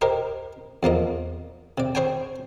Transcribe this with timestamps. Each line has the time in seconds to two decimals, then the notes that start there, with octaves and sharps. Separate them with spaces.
0.01 G4 A#4 C5 D#5
0.83 E2 F3 A#3 D#5
1.78 C3 D5
1.95 G#4 C5 C#5 G5 G#5